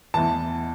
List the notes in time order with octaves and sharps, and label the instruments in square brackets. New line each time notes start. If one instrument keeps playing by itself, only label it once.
[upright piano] E2 E3 A5